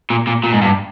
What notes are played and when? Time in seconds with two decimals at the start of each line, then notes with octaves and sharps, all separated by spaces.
0.10 A#2
0.27 A#2
0.44 A#2
0.53 G#2
0.62 G2